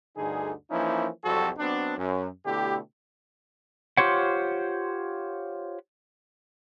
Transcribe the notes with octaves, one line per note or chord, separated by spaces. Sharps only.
D2 G2 D3 D#4 G#4
E3 F3 A#3 C#4 D#4 E4
C2 F2 F#3 G3 F#4 A4
F#3 B3 C4 D4
F#2
B2 D3 A3 E4 G4
F4 G4 C5 C#5 F#5